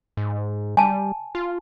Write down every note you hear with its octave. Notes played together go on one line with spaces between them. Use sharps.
G#2
G3 G#5 A5
F4